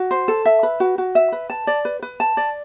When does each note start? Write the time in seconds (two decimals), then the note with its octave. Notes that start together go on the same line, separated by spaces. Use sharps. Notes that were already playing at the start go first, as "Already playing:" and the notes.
Already playing: F#4
0.11 C5
0.28 A4
0.45 E5
0.63 B4
0.80 F#4
0.98 F#4
1.15 E5
1.32 B4
1.50 A5
1.67 D5
1.85 B4
2.02 B4
2.20 A5
2.37 D5